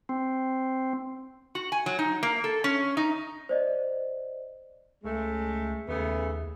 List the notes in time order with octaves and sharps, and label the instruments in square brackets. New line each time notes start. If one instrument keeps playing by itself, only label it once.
[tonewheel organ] C4
[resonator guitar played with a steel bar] F#4
G#5
F#3
D#4
A#3
A4
C#4
D#4
[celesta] C5 D5 D#5
[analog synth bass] C#2 [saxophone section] G#3 A3
[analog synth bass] D#2 [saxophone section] C#3 A3 B3